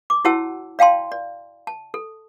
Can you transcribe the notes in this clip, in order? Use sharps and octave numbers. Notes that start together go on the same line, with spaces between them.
D6
E4 F#4 C#5 F#5 A5 E6
D5 F5 G5 A5 C6
D5
A5
A4